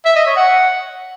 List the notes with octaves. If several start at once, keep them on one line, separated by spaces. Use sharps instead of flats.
E5
D#5
C#5
F#5